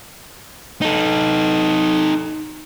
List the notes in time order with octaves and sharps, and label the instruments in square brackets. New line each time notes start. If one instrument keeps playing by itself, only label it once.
[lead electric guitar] D#4 A4